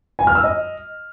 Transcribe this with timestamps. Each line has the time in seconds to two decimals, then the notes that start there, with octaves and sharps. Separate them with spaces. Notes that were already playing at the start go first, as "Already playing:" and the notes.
0.19 G#5
0.27 F6
0.35 E6
0.44 D#5